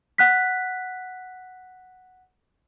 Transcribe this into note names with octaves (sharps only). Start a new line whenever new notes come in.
F#5 F#6 B6